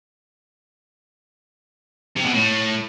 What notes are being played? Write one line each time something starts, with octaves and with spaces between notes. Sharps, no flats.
C3
B2
A2